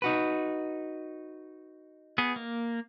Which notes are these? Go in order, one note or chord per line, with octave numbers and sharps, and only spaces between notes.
D#4 F#4 B4
B3 G#4
A#3